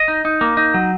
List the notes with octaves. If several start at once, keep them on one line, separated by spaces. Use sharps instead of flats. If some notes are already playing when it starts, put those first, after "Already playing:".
Already playing: D#5
D#4
D#4
A#3
D#4
F#3